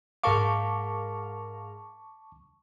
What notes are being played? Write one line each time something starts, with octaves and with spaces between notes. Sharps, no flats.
G#2 A#4 F5 A5 C#6 D6